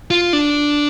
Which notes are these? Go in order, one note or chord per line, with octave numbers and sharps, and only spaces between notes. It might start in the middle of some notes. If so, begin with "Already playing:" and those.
F4
D4